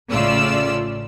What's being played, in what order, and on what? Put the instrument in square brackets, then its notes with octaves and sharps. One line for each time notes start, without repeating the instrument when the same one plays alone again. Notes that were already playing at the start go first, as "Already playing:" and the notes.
[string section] A1 A2 C#3 F4 D5 E6